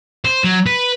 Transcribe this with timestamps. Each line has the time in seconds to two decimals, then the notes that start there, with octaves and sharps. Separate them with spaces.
0.25 C5
0.44 F#3
0.66 B4